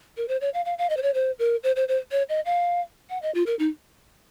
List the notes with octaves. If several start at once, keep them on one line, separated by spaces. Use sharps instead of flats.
A#4
C5
C#5
F5
F5
F5
D#5
C5
C#5
C5
A#4
C5
C5
C5
C#5
D#5
F5
F#5
D#5
F4
A#4
D#4